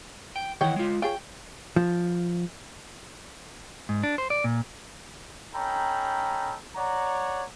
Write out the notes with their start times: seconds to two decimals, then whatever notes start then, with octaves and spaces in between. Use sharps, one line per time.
0.36 G5
0.61 D#3 E3 C#5 F#5 G5
0.76 G#3 F4
1.02 F4 G#4 C#5 G5
1.76 F3
3.89 G#2
4.03 D4
4.18 C5
4.30 D5
4.44 A#2
5.54 C#4 D#4 A4 G5 A#5 B5
6.75 C#5 D5 F#5 A#5